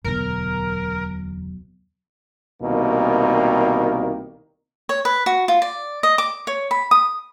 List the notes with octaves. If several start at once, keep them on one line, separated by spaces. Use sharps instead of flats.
E1 D2 B2 F#3 A#4
C2 B2 D#3 A#3
C#5
B4
F#4
F4
D5
D#5
D6
C#5
B5
D#6